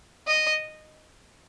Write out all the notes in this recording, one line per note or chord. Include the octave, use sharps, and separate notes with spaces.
D#5